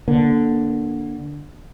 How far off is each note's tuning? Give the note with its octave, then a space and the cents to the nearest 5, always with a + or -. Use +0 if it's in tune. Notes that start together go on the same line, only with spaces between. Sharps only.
D3 +0 A#3 +20